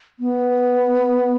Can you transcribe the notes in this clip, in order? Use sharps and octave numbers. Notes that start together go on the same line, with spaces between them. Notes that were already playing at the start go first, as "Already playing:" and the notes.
B3